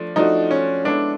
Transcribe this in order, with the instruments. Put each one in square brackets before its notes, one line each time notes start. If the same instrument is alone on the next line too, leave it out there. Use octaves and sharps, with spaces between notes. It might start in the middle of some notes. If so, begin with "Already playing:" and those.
Already playing: [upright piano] F3 A3 D4
[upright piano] F3 A3 D4 F#4 [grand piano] D#4
[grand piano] C#4
[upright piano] G#3 B3 E4 A4 C#5 [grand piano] D4